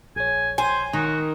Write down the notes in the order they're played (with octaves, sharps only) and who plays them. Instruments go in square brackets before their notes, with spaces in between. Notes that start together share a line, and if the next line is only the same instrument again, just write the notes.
[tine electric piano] A#1 C#5 [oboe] G#5
[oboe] C5 [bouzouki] G#5
[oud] D#3 [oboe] F#4